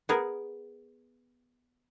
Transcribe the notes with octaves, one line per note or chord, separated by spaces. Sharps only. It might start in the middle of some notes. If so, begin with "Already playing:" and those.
B3 G#4 A#4